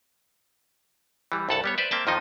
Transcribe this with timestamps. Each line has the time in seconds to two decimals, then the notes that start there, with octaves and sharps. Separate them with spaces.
1.32 E3 G3
1.49 C2 G2 A4 F#5 A5
1.64 G3 B3 C#5
1.78 B4 C5 D5 E5
1.91 A#3 C4 E5 G5 A5
2.07 F2 D#3 F3 D#4 D#5